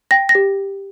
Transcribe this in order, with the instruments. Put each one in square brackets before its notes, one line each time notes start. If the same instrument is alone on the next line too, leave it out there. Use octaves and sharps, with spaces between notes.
[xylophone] G5 A#6
A#6
G4